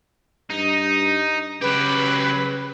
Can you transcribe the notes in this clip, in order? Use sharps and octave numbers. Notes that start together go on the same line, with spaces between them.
G2 D#4
C#3 F#3 G4 B4